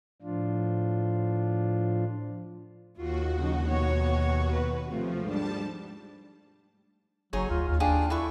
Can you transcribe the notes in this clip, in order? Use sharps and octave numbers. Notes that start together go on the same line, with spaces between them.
A2 F3 D4 F4
D#2 F4 F#4
C#3 F3 D#4
B2 B3 C#5
B2 B4
C3 F3 A3 F4
G#2 G3 D4 A5
F#1 F#3 D#4 G#4 C#5
D2 F4
D#2 F4
D4 F4 G4 G#4
E4 A4 B4 C#6